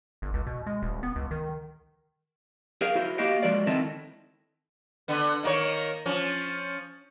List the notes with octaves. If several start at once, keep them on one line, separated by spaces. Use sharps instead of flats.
G1
C#2
B2
G#3
D#1
B3
C#2
D#3
G#4 A#4 F5
E4 F#4 C5
A#3 F#4 G4 D#5 F5 G5
F3 G#3 F#4 A#4 C5 D5
D#3 C4 E4 A4 D#5 A5
D3 B3
D#3 A#3 C#5
F3 C#4